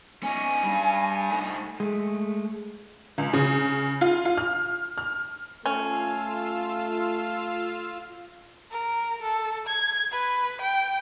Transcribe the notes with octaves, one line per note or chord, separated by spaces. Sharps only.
C#4 D#4 G#5
G3 D4
A3 D#4
G#3 A3
C#2
C#3
F4
F4
F6
F6
A3 C#4 F4 F5 E6
A#4
A4
G#6
B4
G5